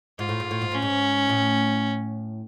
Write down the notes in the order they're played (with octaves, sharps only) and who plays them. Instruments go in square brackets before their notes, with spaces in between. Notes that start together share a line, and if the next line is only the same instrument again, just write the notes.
[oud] G#2 [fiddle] F4
[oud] A2
G#2
A2
G#2
[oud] A2 [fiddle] C#4
[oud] G#2
A2